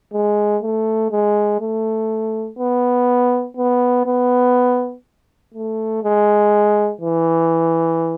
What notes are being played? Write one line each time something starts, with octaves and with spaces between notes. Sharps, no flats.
G#3
A3
G#3
A3
B3
B3
B3
A3
G#3
E3